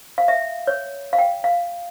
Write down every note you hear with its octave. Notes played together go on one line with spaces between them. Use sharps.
F5
E5
C#5
F5
G5
F5